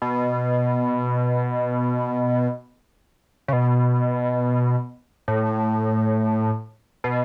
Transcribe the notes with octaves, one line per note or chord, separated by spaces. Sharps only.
B2
C#3
B2
A2
B2